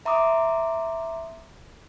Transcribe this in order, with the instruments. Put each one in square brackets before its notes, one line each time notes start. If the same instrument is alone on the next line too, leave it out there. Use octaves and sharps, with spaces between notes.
[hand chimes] E5 A#5 C6 D6 D#6